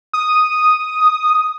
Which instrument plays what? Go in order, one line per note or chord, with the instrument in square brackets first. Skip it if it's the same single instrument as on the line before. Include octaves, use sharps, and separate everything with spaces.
[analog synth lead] D#6